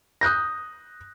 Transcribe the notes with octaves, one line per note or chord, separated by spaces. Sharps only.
D#6 F#6 G6 A#6